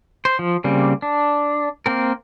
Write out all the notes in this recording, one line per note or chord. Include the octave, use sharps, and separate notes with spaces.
C5
F3
C#3 G3 A#3 C4
D4
A#3 C4 A#4